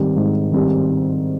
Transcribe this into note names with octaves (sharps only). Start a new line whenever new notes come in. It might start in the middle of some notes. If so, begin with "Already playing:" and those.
Already playing: G#2 D#3 G3 C4 G4
G#2
D#3 G3 C4 G4